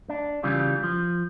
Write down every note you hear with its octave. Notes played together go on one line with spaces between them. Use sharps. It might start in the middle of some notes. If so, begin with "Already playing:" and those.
D4
C#3 E3 G3 F4
F3